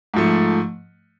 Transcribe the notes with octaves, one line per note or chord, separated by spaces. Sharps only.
G#2 F3 A3